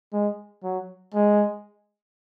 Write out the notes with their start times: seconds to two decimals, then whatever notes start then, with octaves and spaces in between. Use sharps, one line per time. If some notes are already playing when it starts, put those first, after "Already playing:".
0.13 G#3
0.64 F#3
1.14 G#3